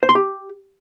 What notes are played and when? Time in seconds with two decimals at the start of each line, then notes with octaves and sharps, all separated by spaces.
0.03 C5
0.09 C6
0.15 G4